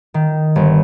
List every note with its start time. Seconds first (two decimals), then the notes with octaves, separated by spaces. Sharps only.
0.14 D#3
0.56 G1